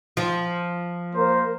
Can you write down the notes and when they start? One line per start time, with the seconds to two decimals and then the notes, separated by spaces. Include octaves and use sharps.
0.17 F3
1.13 A#3 A#4 C5